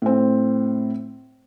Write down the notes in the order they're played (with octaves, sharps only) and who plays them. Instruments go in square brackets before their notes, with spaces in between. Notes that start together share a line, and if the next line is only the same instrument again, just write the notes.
[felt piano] A2 C4